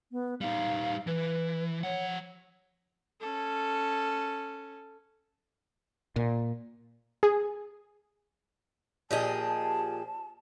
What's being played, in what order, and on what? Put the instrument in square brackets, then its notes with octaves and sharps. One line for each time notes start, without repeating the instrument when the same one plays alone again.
[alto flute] B3
[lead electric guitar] G3 D#4 [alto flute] F5
[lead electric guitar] E3 [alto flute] B4
[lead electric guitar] F3 F#5 [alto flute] C#5
[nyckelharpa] C#4 A4
[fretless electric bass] A#2
[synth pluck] G#4
[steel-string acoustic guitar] A#2 F3 G#4 [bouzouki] G4 D#5 [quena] A5